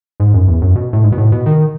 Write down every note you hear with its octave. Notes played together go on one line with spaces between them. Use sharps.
G#2
F#2
E2
F#2
B2
A2
G#2
B2
A2
B2
D#3